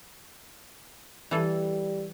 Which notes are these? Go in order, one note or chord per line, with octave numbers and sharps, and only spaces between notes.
E3 G3 A4